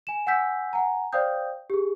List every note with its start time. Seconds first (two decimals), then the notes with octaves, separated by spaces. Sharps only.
0.07 G#5 E7
0.27 F#5 G#5 E6 G6 B6
0.73 F#5 G#5 A#5
1.13 C5 D5 F5 G5 D#6 G6
1.70 G4 G#4